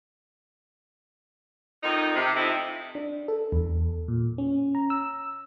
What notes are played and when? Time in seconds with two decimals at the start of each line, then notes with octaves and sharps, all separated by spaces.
1.84 F2 D#3 D#4
2.16 C3
2.36 F3 A3 C4 D#4 E4
2.95 D4
3.28 A4
3.52 E2
4.08 A#2
4.38 C#4
4.75 A#5
4.90 E6